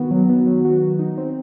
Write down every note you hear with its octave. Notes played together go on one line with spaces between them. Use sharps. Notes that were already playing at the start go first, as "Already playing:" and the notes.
Already playing: D#3 B3 F#4
F#3
B3
F#3
F#4
F#3
D#4
C4